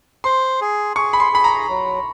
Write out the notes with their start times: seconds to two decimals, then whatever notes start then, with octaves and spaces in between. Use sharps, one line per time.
0.24 C5 C6
0.61 G#4
0.96 G#4 C#6
1.13 B5
1.20 C6
1.32 G#4 B5
1.44 A#5
1.69 F#3